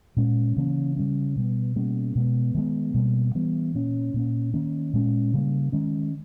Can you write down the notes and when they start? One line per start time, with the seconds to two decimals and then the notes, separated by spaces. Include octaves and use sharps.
0.17 A#2 G#3 C#4
0.57 C#3 E3 A#3 C#4
0.96 C#3 G3 A#3 C#4
1.36 B2 G3 B3
1.76 B2 G3 A#3 C#4
2.15 B2 G#3 B3
2.55 D#3 G#3 B3
2.94 B2 G3 A#3
3.35 E3 G3 B3
3.75 A#2 A#3 C#4
4.14 A#2 A#3 C#4
4.54 D#3 A#3 C#4
4.94 A#2 G#3 C#4
5.34 C#3 G3 A#3
5.72 D#3 G#3 C#4